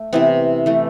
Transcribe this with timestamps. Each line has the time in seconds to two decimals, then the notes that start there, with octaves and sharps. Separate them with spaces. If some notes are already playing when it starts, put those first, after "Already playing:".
Already playing: A3
0.13 C3 E3 B3 C4
0.66 E3 A3